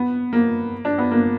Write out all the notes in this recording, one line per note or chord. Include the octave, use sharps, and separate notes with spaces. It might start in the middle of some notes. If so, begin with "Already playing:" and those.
Already playing: B3
A#3
D4
B3
A#3